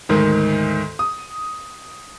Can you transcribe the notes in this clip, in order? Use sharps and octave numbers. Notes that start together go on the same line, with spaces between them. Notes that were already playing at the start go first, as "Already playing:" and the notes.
D2 G#2 D#3
D#6